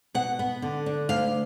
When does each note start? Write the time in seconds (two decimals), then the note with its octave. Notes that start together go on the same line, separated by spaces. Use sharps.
0.14 B2 F#5
0.39 B3
0.62 D3
0.86 D4
1.09 D2 F5